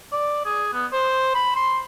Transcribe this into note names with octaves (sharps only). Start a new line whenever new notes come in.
D5
G#4
B3
C5
B5
C6